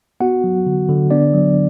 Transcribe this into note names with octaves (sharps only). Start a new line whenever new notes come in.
B3 F#4 F#5
F#3
D3
D3
B3 D4 D5
F#3